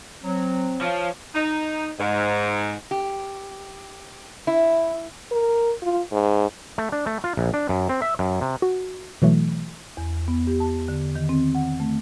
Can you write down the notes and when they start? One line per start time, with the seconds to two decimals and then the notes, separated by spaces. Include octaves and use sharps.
0.24 F#3 C4
0.81 F3 C#5 F5
1.34 D#4
1.99 G#2
2.91 G4
4.47 E4
5.32 A#4
5.82 F4
6.12 G#2
6.78 A3
6.92 D4
7.06 A3
7.24 F4
7.37 A#1
7.54 D4
7.69 F#2
7.89 C4
8.02 E5
8.19 F#2
8.41 C3
8.62 F#4
9.22 B2 E3 F#3 A3
9.97 E2
10.28 B3
10.47 G4
10.60 A5
10.88 D3
11.15 D#3
11.29 C4
11.55 F#5
11.80 A3